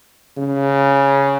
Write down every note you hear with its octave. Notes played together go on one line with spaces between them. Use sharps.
C#3